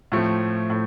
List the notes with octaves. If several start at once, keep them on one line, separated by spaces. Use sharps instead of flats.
A2 F3 A3 C4
A2